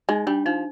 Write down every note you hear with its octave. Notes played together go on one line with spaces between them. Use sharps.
G#3 D#4
G3 D4
F3 D#4